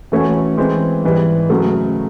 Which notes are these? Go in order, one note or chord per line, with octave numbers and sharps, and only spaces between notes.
E3 A3 C#4 F#4
E3 G#3 C4
G#2 E3 G3
C#3 F#3 A3